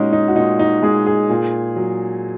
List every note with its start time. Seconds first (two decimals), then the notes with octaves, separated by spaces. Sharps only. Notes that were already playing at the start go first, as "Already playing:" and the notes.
Already playing: A#2 G#3 C#4 D#4 F#4
0.13 D#4
0.28 F#4
0.36 A#2 D#4
0.59 D#4
0.83 G#3 G#4
1.06 G#4
1.30 A#2
1.76 F#3